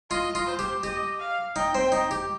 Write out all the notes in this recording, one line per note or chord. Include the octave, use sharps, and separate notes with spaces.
F4 D#5
F4
C5
G4
G4 D#5
F5
D#4 G5
C4
D#4
G4